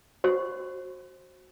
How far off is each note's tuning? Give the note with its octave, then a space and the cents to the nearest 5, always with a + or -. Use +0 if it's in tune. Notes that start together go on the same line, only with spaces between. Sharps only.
F#4 -5 C5 +25 C#6 +0